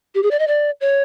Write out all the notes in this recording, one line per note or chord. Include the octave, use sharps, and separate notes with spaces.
G4
G#4
D5
D#5
D5
C#5